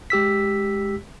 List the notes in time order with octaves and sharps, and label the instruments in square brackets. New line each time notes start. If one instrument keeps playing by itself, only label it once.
[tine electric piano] G#3 G4 E6 B6